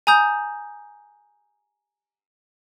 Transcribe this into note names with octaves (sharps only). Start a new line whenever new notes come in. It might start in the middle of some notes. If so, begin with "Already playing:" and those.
G#5 A#5 D#6 G6